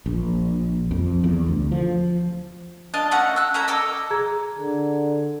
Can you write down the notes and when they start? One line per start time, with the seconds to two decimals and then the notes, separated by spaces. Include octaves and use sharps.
0.06 A#1
0.91 F2
1.24 E2
1.48 D2
1.72 F3
2.94 D4 F4 D#5 A5
3.11 A3 C#4 D#4 F#5
3.36 E6 F#6
3.54 C#4 E4 A4 A#5
3.68 A4 D#5 D6 E6
4.11 G#4 A#5 G#6
4.59 D3